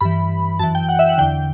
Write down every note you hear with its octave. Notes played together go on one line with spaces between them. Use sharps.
G2 E3 B5
F#2 E3 A5
G5
F#5
E5
F#5
E2 D3 G5